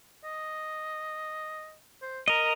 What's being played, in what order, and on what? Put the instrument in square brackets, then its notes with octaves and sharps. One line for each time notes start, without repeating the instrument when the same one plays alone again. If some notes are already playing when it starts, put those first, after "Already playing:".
[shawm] D#5
C5
[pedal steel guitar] A#4 D#5 [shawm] A#5